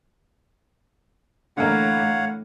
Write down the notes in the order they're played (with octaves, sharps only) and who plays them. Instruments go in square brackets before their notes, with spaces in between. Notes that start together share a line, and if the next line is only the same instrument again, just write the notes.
[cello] A2 [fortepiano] D3 E3 A#3 [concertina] C#5 F5 F#5